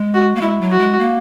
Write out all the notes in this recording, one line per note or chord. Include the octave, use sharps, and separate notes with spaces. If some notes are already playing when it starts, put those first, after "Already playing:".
Already playing: G#3
F#4
A#3
G#3 E4
F#3
F#4
G#3
A#3